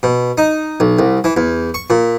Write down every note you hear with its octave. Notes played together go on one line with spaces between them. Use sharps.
B2
D#4
B1
C2
E3
E2
C#6
A#2